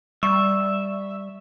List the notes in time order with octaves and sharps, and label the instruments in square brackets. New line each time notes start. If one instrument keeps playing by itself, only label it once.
[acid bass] G3 [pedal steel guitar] E5 [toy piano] C#6